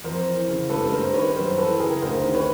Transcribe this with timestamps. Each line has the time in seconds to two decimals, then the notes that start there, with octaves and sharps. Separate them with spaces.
0.04 F2 A#4 C5
0.26 E3
0.48 C#3
0.69 G2 A4 B4
0.92 G2 A#4 C5
1.14 D#3 B4 C#5
1.36 F#2 A#4 C5
1.58 E3 A4 B4
1.79 C#3 G#4 A#4
2.02 D2 A#4 C5
2.24 D#3
2.35 B4 C#5